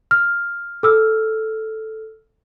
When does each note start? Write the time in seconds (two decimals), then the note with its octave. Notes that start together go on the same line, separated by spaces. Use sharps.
0.11 F6
0.83 A4 E6 F6